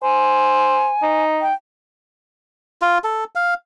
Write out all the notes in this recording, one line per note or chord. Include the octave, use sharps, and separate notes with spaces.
C5 G#5
D#4
G5
F4
A4
F5